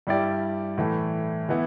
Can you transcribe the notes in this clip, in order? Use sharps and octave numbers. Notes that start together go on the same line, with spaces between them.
G2 G3 E4 G4 D5
A2 E3 A3
E3 B3 E4